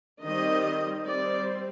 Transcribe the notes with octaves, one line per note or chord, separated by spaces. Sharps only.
D#3 G3 C4 D#5
G3 C4 D5